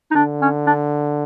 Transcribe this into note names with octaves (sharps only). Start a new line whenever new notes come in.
D#4
D3 D4
C#4
D4